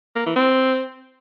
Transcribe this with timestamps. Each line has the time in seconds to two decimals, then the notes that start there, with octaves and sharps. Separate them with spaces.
0.16 A#3
0.26 E3
0.36 C4